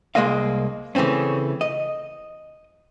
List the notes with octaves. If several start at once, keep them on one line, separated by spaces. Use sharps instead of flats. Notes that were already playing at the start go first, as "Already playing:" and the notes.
C2 C#3 G#3 A#3 D#5 F5
C#3 E3 A3 C4 C#4
D#5